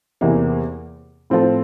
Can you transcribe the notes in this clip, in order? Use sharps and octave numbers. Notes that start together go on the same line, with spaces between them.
E2 C3 E3 A#3 E4
A2 F3 C4 F4 A4